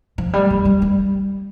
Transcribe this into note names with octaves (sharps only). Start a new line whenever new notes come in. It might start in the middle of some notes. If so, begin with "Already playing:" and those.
F3
G3
G3
G3
G3